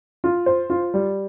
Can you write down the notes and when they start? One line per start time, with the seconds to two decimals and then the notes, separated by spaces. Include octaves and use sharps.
0.24 F4
0.46 C5
0.70 F4
0.94 G3